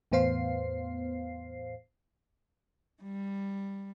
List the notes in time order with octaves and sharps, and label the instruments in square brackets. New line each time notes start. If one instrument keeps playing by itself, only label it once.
[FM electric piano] E2 A2 B3 C5 F5 C7
[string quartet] G3